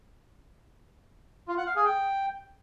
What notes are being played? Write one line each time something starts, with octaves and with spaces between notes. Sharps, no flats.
F4
F#5
F5
G#4
G5